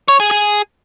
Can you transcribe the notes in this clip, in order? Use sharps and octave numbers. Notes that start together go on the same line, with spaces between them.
C#5
G#4
G#4